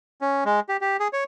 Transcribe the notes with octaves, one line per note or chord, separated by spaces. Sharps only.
C#4
G#3
G4
G4
G#4
C#5